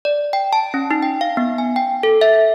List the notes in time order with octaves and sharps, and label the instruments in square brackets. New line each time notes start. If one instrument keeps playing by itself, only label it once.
[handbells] D5
G5
A5
C#4
D#4
G5
F5
B3
G#5
G5
A4
E5